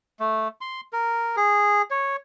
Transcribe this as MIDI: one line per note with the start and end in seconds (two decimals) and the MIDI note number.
0.20 0.48 57
0.61 0.81 84
0.93 1.36 70
1.37 1.82 68
1.91 2.16 73